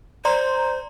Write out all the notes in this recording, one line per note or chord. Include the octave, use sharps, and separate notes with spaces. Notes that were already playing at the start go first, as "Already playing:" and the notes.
C5 D5 A#5 C6